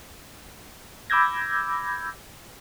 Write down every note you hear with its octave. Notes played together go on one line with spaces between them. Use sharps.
B5 D6 E6 G6 G#6 A#6